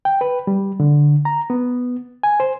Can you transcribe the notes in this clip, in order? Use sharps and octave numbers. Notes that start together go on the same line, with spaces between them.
G5
B4
G3
D3
A#5
B3
G#5
C5